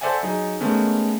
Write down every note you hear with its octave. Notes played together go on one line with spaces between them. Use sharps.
A4 C5 D5 E5 F#5 G#5
F#3 D#4 G#4
D#3 G#3 A3 B3 C#4